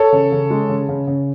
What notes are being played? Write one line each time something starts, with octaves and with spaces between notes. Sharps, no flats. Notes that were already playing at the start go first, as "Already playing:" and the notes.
Already playing: A4 C#5
C#3
C#3
G#3
C#3
C#3
C#3